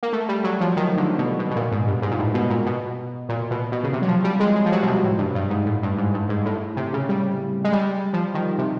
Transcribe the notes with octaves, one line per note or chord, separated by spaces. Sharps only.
A#3
A3
G3
F#3
F3
D#3
D3
B2
B2
B2
A#2
G#2
G2
G#2
A#2
A2
B2
A#2
B2
A#2
B2
B2
C#3
C3
F#3
F3
G3
G#3
G#3
F3
F#3
B2
C3
A2
G2
G2
G#2
A2
G2
G#2
G2
G#2
A2
C3
C#3
G3
G#3
G3
F3
D#3
C3